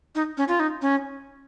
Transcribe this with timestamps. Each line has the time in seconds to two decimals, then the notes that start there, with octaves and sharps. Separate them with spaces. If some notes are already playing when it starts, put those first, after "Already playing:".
0.15 D#4
0.37 C#4
0.48 F4
0.60 D#4
0.82 C#4